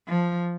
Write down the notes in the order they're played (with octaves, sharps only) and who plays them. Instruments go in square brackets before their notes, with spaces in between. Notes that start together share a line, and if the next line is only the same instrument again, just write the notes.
[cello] F3